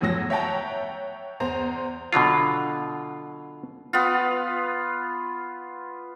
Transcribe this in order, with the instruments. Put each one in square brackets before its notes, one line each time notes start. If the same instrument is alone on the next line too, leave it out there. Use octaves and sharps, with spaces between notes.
[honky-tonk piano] E2 A2 F3 F#3 E6 A#6
C#5 E5 F#5 G5 A5 A#5
E2 C5 A#5
[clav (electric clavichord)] B2 D3 F#3 F4
[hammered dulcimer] B3 F4